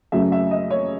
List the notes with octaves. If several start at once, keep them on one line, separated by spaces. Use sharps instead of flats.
F#2 C#3 F#3 A3 E5
E5
D#5
C#5